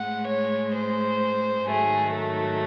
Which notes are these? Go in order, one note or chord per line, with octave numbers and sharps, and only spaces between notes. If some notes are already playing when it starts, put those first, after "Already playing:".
Already playing: A2 G#3 F#5
C#5
C5
G#2 D#3 F#3 A3 G#4
A4